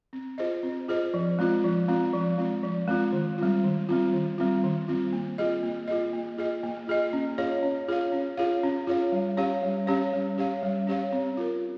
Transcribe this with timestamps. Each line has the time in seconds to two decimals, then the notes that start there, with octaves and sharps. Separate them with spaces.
0.13 C4
0.38 F4 G#4 C5 D#5
0.63 C4
0.88 F4 G#4 C5 D#5
1.14 F3
1.39 G#3 C4 F4
1.64 F3
1.88 G#3 C4 F4
2.13 F3
2.38 G#3 C4 F4
2.64 F3
2.88 G#3 C4 F4
3.13 D#3
3.38 G3 C4 F4
3.64 D#3
3.89 G3 C4 F4
4.13 D#3
4.38 G3 C4 F4
4.63 D#3
4.88 G3 C4 F4
5.13 A#3
5.38 F4 G#4 D#5
5.63 A#3
5.88 F4 G#4 D#5
6.13 A#3
6.37 F4 G#4 D#5
6.63 A#3
6.87 F4 G#4 D#5
7.13 C#4
7.38 F4 G#4 C#5 F5
7.63 C#4
7.88 F4 G#4 C#5 F5
8.12 C#4
8.37 F4 G#4 C#5 F5
8.63 C#4
8.87 F4 G#4 C#5 F5
9.12 G3
9.37 C#4 G4 C#5 F5
9.63 G3
9.87 C#4 G4 C#5 F5
10.13 G3
10.38 C#4 G4 C#5 F5
10.63 G3
10.87 C#4 G4 C#5 F5
11.12 C4
11.37 F4 A#4